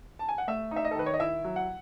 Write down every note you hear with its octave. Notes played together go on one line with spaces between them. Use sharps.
A5
G#5
F#5
A3 E5
D#4
E5
D#5
A4
D#3 B4
C#5
D#5
E4 E5
F#3
F#5